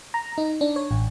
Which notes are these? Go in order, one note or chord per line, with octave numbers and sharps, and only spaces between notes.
A#5
D#4
D4
C#5
A1